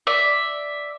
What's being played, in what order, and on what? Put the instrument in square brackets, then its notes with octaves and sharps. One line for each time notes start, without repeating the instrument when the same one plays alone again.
[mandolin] D5 E5